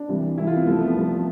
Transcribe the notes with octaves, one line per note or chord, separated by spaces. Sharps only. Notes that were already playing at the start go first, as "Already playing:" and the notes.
Already playing: D4
C2 C3 E3
C2 C3 E3 E4
F4
B3
C2 C3 F3 A3
B3
C2 C3 F3